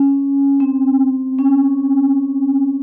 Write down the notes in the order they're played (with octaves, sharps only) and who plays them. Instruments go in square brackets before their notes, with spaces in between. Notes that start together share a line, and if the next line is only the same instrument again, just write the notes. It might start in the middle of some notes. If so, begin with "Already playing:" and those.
Already playing: [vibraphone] C#4
C4
C#4